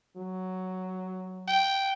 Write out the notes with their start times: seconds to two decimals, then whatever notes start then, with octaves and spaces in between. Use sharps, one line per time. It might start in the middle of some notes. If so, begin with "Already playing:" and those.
0.17 F#3
1.48 G5